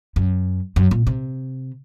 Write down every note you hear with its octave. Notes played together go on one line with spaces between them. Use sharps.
F#2
F#2
A#2
C3